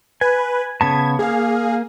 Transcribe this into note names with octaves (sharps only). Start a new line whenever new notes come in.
B4 G#5
C#3 B3 A5 G#6
A#3 G#4 F5